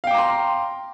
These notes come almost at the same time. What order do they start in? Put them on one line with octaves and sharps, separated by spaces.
F5 G5 D6 A#5 C6